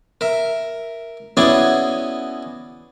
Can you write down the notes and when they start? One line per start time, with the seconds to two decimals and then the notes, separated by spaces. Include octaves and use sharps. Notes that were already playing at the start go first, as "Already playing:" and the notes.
0.21 A#4 E5
1.37 B3 C#4 E4 F#4 G#4 D5